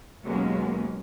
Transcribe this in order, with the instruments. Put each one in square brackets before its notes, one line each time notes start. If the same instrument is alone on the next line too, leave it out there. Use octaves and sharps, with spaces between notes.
[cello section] D#2 B2 F#3 G#3 A#3 C#4